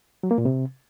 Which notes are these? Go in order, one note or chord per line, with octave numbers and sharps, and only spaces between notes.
F#3
A#3
A#2
C3